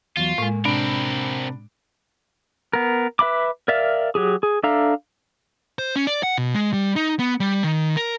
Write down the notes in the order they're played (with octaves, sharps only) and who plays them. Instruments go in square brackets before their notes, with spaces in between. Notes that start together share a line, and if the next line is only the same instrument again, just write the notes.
[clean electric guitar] E2 F#3 [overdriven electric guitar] F4
[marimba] A2 G#3 [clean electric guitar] A#3
[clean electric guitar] C3 [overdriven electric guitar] C4 A#4 [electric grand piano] D4 B5 D7
[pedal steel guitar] B3 A#4
B4 E5 B5 D6
A#4 D5 E5 F5
F#3 G4 G#4
G#4
D4 A4 E5 F5 A#5
[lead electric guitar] C5
C#4
D5
F#5
B2
G#3
G3
D#4
B3
G3
D#3
A#4